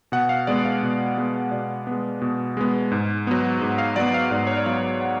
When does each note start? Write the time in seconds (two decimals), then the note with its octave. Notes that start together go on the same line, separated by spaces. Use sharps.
0.12 B2 F#5
0.29 F5
0.47 G#3 B3 D5
0.65 F5
0.83 B2
1.18 G#3 B3
1.51 B2 D5
1.87 G#3 B3
2.22 B2
2.57 G#3 B3
2.92 G#2
3.27 F#3 B3
3.61 G#2
3.78 F5
3.96 F#3 B3 D5
4.14 F5
4.31 G#2 D5
4.47 C#5
4.56 D5
4.66 F#3 B3 F5
5.01 F#5